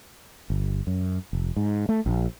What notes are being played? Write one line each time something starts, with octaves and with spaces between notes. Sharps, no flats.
G1
F#2
F1
G#2
A3
A#1